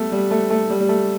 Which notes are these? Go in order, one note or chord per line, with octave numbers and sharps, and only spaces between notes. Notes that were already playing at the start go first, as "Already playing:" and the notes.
Already playing: G3 A3 B3
G3
A3
A3
G3
G3
A3